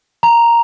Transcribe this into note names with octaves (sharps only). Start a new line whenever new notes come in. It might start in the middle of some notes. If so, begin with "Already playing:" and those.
A#5